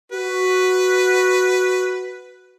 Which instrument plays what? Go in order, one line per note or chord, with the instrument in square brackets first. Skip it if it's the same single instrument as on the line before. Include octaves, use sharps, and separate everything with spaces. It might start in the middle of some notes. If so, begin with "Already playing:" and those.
[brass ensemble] F#4 [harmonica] B4